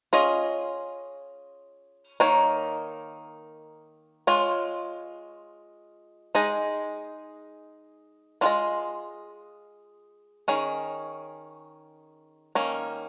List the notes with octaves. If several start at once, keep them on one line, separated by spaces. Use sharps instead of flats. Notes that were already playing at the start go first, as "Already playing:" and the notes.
C#4 F4 G#4 D#5
D#3 A#3 D#4 C#5
G#3 F4 C#5
G#3 D#4 G#4 D#5
G#3 C#4 F4 G#4 D#5
D#3 C#4 G#4
D#3 A#3 C#4